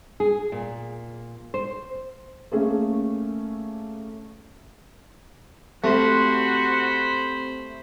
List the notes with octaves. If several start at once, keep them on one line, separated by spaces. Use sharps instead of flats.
G#4
A#2
C5
A3 A#3 C#4 G#4 A4
A3 C4 F#4 G4 C5 B5 C6